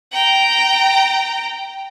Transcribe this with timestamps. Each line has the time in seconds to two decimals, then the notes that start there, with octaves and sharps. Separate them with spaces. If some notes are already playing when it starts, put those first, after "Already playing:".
0.12 G5 A#5